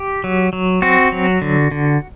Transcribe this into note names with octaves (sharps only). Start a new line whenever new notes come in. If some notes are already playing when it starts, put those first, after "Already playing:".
Already playing: G4
F#3
F#3
C4 F#4
F#3
D3
D3